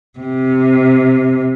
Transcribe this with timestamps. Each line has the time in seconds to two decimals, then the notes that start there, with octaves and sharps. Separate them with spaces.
0.19 C3